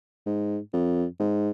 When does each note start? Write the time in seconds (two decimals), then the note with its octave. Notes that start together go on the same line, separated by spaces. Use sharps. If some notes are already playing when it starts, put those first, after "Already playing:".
0.26 G#2
0.73 F2
1.20 G#2